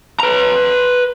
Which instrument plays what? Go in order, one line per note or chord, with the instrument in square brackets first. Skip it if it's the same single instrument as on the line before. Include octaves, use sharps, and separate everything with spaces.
[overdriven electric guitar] B4 A#5